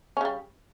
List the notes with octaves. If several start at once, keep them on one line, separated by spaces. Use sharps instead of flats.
C#3 G3 C#4